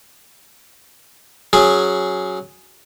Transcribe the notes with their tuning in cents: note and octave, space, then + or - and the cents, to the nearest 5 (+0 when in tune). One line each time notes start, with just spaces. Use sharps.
F#3 +0 C#4 +0 G#4 +0